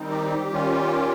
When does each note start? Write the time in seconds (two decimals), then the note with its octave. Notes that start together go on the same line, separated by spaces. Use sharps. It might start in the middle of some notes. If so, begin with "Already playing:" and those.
Already playing: D#3 G3 C4 D#4
0.10 G4
0.51 D#3 G3 C#4 F4